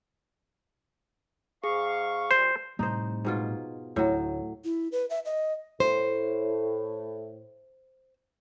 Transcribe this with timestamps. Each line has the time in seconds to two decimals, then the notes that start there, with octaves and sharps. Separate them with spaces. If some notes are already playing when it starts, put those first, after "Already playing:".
1.64 G#2 G#4 F5 C#6
2.31 A#2 G3 C5
2.79 A2 C3 G3 D#4 C5
3.25 G#2 B2 F4
3.96 D2 A2 F#3
4.65 E4
4.92 B4
5.10 E5
5.25 D#5
5.80 A2 C5